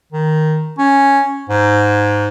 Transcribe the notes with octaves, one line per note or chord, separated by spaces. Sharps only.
D#3
C#4
G#2